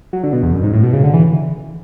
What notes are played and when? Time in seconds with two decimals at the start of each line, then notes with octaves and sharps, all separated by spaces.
0.13 F#3
0.23 D3
0.33 B2
0.43 E2
0.53 F#2
0.63 G#2
0.73 A2
0.83 B2
0.93 C#3
1.04 D3
1.14 E3